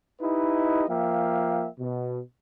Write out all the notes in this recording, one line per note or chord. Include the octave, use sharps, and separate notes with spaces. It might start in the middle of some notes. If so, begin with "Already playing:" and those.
D#4 E4 G4 B4 D#5
F3 A#3 E5 F5 G5
B2